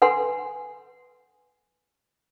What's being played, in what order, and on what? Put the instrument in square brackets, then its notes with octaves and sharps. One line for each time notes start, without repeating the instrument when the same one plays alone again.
[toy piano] A4 B4 F#5 G#5 C6